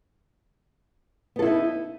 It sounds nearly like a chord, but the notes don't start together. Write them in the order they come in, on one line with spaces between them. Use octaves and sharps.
B3 A4 E4 D#4